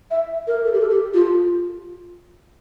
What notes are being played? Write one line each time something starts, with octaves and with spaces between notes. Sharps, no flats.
E5
A#4
A4
G4
A4
G4
F4